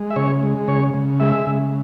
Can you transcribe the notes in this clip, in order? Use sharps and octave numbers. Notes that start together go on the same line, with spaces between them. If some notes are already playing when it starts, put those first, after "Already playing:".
Already playing: G#3
E5
C#3 C#5
G#3
C#3 C#5
C#3
G#3 E5
C#3